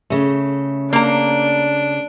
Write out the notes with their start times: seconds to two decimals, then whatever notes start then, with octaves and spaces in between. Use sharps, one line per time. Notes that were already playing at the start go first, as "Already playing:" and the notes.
0.10 C#3 A3
0.93 A#3 D4 A#5